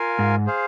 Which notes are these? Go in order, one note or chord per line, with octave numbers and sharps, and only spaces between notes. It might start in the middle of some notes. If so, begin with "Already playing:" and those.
Already playing: F4 A#4 F5 G#5
G#2
G#4 C5 F5